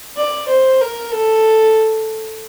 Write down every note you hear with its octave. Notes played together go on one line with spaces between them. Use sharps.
D5
C5
A#4
A4